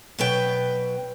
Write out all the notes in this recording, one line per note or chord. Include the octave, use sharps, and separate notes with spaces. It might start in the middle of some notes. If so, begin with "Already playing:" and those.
B2 F#3 B4 G5